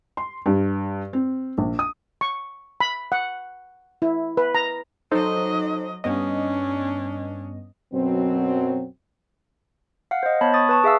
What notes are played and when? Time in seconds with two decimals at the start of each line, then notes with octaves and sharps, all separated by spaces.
0.17 C6
0.46 G2
1.13 C4
1.58 A#1
1.79 D#6
2.21 C#6
2.80 B5
3.12 F#5
4.02 E4
4.37 B4
4.55 A#5
5.12 F#3 D#4 A4 C5 D#5
6.04 G2 B3 C#4 D4 D#5
7.93 F#2 B2 F#3 C4
10.11 F5 F#5
10.23 C5 D#5
10.41 B3 C#5 A5 B5
10.54 C#6 D#6 A6
10.69 B4 A5 C#6
10.84 G#4 E5 F5 E6